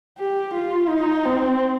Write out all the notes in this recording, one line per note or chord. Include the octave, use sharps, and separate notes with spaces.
G4
F4
D#4
C4